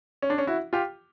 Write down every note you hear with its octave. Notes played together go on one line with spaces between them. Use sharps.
C#4
D4
C#4
E4 F#4
F4 G4